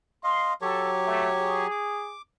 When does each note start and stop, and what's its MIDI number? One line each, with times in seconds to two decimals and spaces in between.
0.24 0.54 75
0.24 0.54 77
0.24 0.55 84
0.62 1.67 54
0.62 1.67 67
0.62 0.94 69
0.62 1.67 73
1.07 1.30 57
1.40 2.15 68
1.71 2.22 86